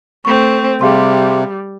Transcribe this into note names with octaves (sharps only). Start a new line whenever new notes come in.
A3 C4 C#6
C3 G3 G#4 F5 C6